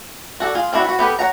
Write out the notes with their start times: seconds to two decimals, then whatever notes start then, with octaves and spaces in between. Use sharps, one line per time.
0.40 F#4 A4 D5
0.55 F4 G#4
0.73 C4 D4 E4 F#4
0.84 F#4 B4
0.99 B3 G4 A4 B4
1.19 C#5 F#5 A#5